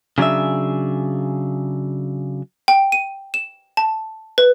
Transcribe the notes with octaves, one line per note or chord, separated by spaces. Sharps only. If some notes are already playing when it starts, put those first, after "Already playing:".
C#3 F#3 D4 G#4 E5
G5
D#7
E7
A5
B4